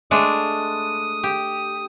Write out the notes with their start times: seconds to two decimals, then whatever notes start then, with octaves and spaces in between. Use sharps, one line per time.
0.11 G#3 A3 D4 D#6
1.23 G4